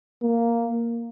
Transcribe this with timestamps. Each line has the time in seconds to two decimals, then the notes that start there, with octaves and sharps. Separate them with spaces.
0.22 A#3